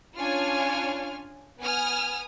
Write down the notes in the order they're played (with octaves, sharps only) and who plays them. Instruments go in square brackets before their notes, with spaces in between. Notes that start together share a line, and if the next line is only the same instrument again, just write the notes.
[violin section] C#4 D4 F4 C#5 G#5 F6
B3 G#5 D#6 F6